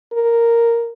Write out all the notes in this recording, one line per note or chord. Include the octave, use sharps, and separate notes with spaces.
A#4